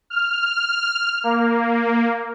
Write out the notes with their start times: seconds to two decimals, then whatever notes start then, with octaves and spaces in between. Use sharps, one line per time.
0.10 F6
1.24 A#3